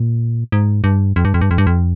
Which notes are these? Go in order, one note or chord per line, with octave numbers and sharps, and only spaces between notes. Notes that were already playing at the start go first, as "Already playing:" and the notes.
Already playing: A#2
G#2
G2
F2
G2
F2
G2
F2
G2
F2